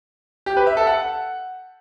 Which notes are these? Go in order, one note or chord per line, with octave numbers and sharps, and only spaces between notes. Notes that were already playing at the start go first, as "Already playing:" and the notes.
G4
B4
E5
A4
F#5